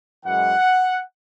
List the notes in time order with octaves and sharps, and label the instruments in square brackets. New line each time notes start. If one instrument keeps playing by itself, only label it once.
[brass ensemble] F#2 E3 G#3 F#5